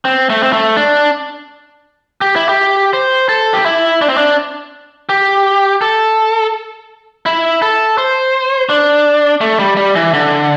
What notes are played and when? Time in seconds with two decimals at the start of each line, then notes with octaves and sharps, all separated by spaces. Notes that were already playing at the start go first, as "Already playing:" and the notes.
0.05 C4
0.30 A3
0.43 C4
0.53 A3
0.77 D4
2.21 G4
2.36 E4
2.49 G4
2.93 C5
3.29 A4
3.54 G4
3.66 E4
4.02 D4
4.09 C4
4.17 D4
5.09 G4
5.81 A4
7.26 E4
7.62 A4
7.98 C5
8.69 D4
9.41 A3
9.59 G3
9.77 G3
9.96 E3
10.14 D3